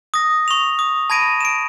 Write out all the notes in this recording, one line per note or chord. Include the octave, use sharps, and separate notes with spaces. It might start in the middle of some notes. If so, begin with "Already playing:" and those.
D#6 A#6
C#6 F7
D#6
A5 B5 G#6 A#6 D7 D#7
D7 E7